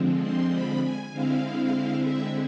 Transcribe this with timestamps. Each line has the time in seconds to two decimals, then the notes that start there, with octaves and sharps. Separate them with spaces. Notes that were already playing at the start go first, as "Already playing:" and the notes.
Already playing: D3 F3 G#3 C4
0.23 C6
0.53 B5
0.84 G#5
1.12 D3 G#3 C4 E4 F5
2.02 E5